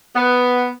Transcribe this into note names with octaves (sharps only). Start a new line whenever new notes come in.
B3